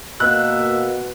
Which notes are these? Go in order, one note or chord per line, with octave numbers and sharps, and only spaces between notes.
B2 A#3 E5 F#6